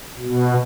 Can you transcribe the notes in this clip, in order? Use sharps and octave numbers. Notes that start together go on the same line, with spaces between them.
B2